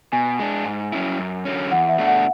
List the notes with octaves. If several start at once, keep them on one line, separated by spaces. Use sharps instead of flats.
B2 G#5
G#3 D4
G#2
F#3 C#4 E4
F#2
D3 F#3 C#4
E2 F#5
E5
B2 A3 D4
F#5